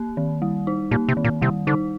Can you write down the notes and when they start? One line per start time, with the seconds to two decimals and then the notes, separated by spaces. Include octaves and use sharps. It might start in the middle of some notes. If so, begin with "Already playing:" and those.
Already playing: A#3
0.17 D#3
0.42 G3
0.67 D#4
0.91 A#2 A#3
1.09 C3
1.17 D#3
1.24 A#2
1.41 C3 G3
1.67 D3 D#4